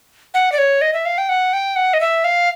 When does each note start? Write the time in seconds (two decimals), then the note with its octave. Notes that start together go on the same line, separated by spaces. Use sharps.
0.34 F#5
0.52 D5
0.58 C#5
0.81 D#5
0.93 E5
1.05 F5
1.18 G5
1.29 F#5
1.53 G5
1.76 F#5
1.94 D#5
2.01 E5
2.24 F5